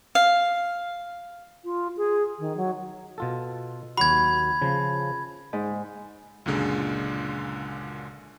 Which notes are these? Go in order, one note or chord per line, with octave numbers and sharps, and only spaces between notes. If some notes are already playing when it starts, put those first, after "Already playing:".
F5
F4
G#4
D#3
F#3
B2 F4 A4
D#2 F#3 F#4 B5 G#6
C#3 F3
G#2
C#2 F#2 A#2 D3 G#3